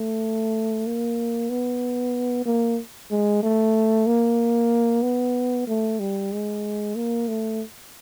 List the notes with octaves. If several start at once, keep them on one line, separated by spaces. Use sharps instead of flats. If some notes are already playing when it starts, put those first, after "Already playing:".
Already playing: A3
A#3
B3
A#3
G#3
A3
A#3
B3
A3
G3
G#3
A#3
A3